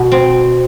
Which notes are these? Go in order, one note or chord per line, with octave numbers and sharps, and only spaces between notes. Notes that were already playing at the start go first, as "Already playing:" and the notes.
Already playing: B2
C4